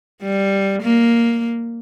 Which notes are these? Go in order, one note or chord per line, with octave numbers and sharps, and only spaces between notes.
G3
A#3